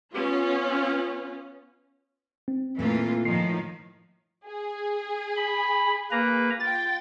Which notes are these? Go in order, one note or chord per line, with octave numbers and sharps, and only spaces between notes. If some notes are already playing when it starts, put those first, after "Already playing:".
B3 C#4 F4
C4
A#2 E3 A3 A#3 F4
A2 D#3 F3 C7
G#4
B5
A#3 B4 A#5
F4 G5 A6